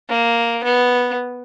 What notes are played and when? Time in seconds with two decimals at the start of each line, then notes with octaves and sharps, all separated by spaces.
0.09 A#3
0.64 B3